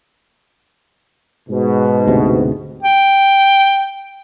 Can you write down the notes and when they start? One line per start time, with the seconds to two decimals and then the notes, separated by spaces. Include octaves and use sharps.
1.49 G#2 B2
2.07 D2 C3
2.83 G5